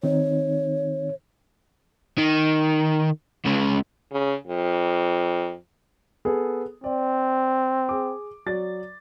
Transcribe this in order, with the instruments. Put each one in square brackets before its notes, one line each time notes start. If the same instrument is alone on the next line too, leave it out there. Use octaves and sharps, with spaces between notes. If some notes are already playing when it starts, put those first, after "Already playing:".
[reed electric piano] D#3 C4 D#4 [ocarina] C#5
[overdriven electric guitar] D#3
C#2 C#3
[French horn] C#3
F2
[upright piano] B3 G#4 A4
[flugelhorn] C4 [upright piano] D5
[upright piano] G#4 D6
F#3 D5 A6